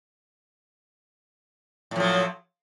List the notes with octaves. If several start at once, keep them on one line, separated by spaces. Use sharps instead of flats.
A2 F3 F#3